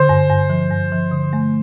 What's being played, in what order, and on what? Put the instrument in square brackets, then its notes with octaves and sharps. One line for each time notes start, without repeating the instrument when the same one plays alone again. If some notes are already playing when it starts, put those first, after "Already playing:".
Already playing: [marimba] D3 [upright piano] C5
[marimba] G2
G2
F3
G2
F3
D3
A3